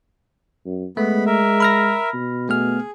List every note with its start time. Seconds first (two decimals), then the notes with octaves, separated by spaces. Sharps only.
0.65 F#2
0.97 G#3 A3 B3 B5
1.26 A#4 E5
1.60 B5 F6 A#6
2.14 B2
2.49 A3 B3 G#4 F6